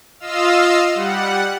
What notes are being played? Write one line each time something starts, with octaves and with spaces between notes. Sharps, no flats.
F4 D#5 F5 E6
G3 F#5